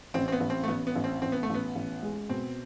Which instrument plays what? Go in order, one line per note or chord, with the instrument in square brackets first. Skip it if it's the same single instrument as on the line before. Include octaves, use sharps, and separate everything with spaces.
[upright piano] A1 [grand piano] C4
[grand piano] C4
B3
[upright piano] A1
[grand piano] C4
A3
[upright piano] A1 [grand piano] B3
[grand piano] B3
[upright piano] A1
[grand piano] C4
[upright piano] A1 [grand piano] C4
[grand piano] B3
A3
[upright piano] A1 [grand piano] B3
[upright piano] A1
G#3
[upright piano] B2 [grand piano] C4